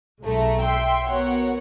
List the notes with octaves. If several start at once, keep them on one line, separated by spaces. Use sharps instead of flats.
B1 G#3 A3 A#5
E5 G5 C6
B3 F#4 A#4 C#5 F#5